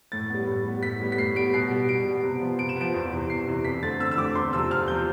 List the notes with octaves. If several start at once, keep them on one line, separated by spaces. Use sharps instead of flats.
A2 A6
G3 B3
A2
G3 B3
A2 B6
G3 B3
B6
A2 C7
G3 B3 D7
B2 C7
G3 B3
B2 D7
G3 B3
C3
F3 B3
C3 D7
E7
F3 B3 D7
E2
C3 E3
E2 C7
C3 E3
F2 B6
D3 A3 C4 A6
F2 E6
E6
D3 A3 C4 D6
E2 C6
C3 F3 C4 E6
E2 F6
C3 F3 C4 G6